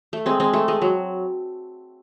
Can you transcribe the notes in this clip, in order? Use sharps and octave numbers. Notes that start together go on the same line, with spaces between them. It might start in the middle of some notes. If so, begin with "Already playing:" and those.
A3
G#3 C4
G#3 C4
A3
G#3
F#3